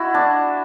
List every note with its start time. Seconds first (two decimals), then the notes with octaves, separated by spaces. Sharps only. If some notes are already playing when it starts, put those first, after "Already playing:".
Already playing: E4 F#4
0.14 D4